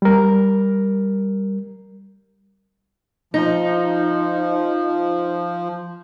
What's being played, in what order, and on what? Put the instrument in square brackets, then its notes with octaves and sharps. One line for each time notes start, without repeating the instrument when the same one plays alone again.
[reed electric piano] G3 A#4
[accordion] F3 [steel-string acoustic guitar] D#4